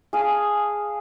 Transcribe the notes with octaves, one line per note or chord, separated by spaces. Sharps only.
G#4 F5 A5